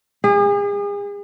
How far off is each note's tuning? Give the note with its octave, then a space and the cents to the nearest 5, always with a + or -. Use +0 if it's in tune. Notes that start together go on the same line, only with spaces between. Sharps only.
G#4 -40